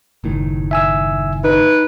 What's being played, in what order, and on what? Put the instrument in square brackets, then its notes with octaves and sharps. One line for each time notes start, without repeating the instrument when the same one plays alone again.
[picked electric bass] F#1 A2 D#3
[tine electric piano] E5 G#5 E6
[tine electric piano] D#4 [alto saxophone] B4